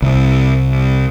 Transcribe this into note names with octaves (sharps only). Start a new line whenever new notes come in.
C2